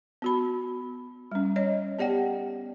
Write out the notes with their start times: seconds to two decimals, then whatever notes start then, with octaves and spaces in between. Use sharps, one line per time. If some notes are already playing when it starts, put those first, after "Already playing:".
0.22 B3 F#4 B5
1.32 G3 C#4
1.56 C#5 D#5
1.99 B3 G4 D5 F#5 G5